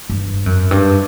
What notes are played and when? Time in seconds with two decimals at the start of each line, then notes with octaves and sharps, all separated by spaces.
0.10 G2
0.46 F#2
0.71 G2